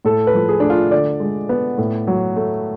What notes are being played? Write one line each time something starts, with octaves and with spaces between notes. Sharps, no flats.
A2 A4
B4
F3
G#4
A3 D4
F4
D3 D5
G#3
B3
A2
F#3
A3